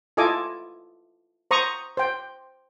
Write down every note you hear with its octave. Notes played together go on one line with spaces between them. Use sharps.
E4 F4 A4 D#5 G#5 D6
C5 A#5 C#6 D#6
C5 G5